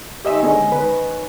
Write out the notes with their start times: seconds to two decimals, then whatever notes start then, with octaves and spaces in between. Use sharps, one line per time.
0.25 D#3 G#3 C4 G4 D#5 E5
0.43 D3 G#3 B3 C#4 D#5 A#5
0.72 D#3 B4